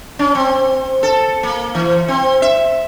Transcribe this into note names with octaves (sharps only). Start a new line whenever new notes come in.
C#4
C4
A4
A#3
E3
C4
E5